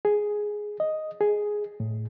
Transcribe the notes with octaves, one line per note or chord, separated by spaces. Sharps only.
G#4
D#5
G#4
A2